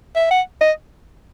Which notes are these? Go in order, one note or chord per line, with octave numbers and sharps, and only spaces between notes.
E5
F#5
D#5